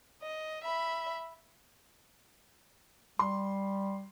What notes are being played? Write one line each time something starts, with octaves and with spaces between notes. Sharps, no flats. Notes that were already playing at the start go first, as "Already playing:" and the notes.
D#5
E5 B5
G3 C6